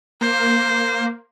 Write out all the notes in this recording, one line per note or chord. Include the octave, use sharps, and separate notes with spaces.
A#3 C5